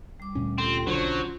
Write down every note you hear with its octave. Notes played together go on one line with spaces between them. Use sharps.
G3 D6
D2 A#2 C#4
C4 F4 G4 A4
B1 D3 F#3 C#4 D4 F4 C5 C#6